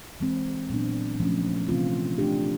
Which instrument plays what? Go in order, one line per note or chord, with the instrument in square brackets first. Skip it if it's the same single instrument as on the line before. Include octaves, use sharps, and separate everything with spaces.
[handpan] E3 G#3 C4
A#2 F#3 B3 D4
C#3 F3 A3 C#4
C3 E3 A3 C4 F4
A3 D4 G4